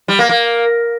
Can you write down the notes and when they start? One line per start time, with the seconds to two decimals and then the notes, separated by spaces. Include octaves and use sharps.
0.08 G3
0.19 A#3
0.29 A#3